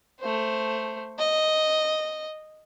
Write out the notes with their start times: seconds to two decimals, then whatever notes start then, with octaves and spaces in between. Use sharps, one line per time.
0.20 A3 C5
1.19 D#5